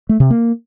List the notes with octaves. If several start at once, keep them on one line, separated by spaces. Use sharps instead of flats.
A3
C3
A#3